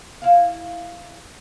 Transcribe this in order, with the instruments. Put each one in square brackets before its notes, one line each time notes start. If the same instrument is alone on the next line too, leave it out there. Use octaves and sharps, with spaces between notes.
[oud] E4 F5